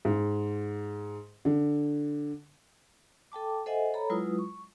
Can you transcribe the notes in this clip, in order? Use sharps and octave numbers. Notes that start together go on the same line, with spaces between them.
G#2
D3
A4 G5 A5 D6
A4 C5 D#5 E5 F#5 G#5
A4 C#5 A#5 B5
F#3 G#3 E4 F4 B4 D#6
C#6